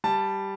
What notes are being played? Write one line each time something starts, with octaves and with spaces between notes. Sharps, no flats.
G3 A5